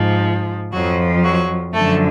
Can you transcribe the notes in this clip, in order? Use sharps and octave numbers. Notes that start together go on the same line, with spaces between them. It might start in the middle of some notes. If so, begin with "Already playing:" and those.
Already playing: G#2 F3
F2 F3 F#3 F#4
F#3 F#4
F#2 D3 F3 A3 A4